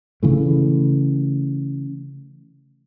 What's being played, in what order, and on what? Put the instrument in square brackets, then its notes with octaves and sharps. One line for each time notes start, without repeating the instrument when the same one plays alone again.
[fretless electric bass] C#3 E3 A3